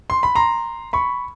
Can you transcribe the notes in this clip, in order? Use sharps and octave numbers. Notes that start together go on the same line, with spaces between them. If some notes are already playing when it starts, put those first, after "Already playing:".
C6
B5
A#5 C6
B5 C#6